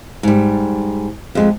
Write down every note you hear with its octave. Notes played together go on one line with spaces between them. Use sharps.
G#2 G3
F2 G#3